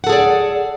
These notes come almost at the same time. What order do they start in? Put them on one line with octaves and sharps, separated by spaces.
F#5 A4 G#4 D5